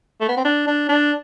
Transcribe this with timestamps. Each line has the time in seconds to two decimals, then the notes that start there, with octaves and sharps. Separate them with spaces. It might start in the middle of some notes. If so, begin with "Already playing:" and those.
0.21 A3
0.29 B3
0.37 C4
0.45 D4
0.67 D4
0.89 D4